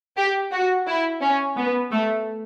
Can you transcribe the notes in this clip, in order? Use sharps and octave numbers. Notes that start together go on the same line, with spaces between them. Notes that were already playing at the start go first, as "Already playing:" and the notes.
G4
F#4
E4
C#4
B3
A3